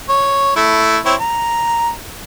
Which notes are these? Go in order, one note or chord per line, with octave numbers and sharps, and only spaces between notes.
C#5
A3 E4
C4 E4 C#5
A#5